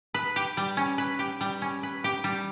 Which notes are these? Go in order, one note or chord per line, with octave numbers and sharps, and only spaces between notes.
B4
G4
G3
C#4
B4
G4
G3
C#4
B4
G4
G3